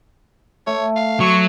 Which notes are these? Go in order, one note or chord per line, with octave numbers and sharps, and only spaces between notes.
A3 C#5
F5
F#3 C#6